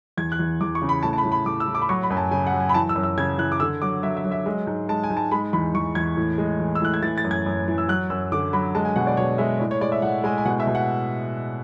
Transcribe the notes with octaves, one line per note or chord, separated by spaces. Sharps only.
E2 G#6
F#6
E2
E2 D6
C#6
C#3
B5
A2 A5
A5
B5
A2
B5
A2 D6
E6
A2
D6
B5
F#3 C#6
B5
F#2 G#5
A5
C#3 G#5
F#5
F#3
G#5
B5
E3 A5
E6
F#2
E6
C#3 G#6
E3 F#6
D6
D3 E6
F#3 D6
F#3 E5
E5
F#3
E5
G#3
G#2
G#3 A5
G#5
G#2
A5
G#3 B5
E2 B5
E2 C#6
E2 G#6
A2
G#3
E3
E6
A2 F#6
G#6
E3 A6
A6
F#2
G#6
F#2
E3
E6
F#3 F#6
F#2 E6
D3 D6
F#3 B5
G#3 A5
G#5
B2 F#5
D5
B2 C#5
G#3 E5
A2 D5
C#5
G#3 D5
E5
A2 F#5
G#3 G#5
G#5
B2 F#5
E5
B2
F#5